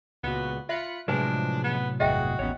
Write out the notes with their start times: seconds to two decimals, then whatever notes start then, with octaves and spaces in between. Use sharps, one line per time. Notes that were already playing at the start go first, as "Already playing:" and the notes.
0.23 C#2 A#2 B3 F#4
0.69 F4 E5 B5 F#6 C#7
1.08 A2 C3 F3 F#3 G#3 D4 B4 G#5
1.64 B3
2.00 G1 E2 F#4 G#4 D#5 E5 G5
2.39 A1 D#2 B3 C#4 C#5